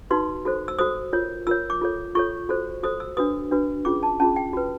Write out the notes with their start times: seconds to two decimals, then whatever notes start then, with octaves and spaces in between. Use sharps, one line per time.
0.10 D#4 F#4 B4 C6
0.45 F#4 A4 C5
0.68 E6
0.79 F#4 A4 C5 D#6
1.13 F4 A#4 C#5
1.47 F4 A#4 C#5 E6
1.70 D6
1.82 F4 A4 C#5
2.15 F4 A4 C#5 C#6
2.49 F#4 A4 C5
2.83 F#4 A4 C5 D#6
3.00 E6
3.17 D4 F#4 B4 D#6
3.51 D4 F#4 B4
3.85 C#4 F4 G#4 D6
4.03 A5
4.20 C#4 F4 G#4 A5
4.36 G5
4.53 F#4 B4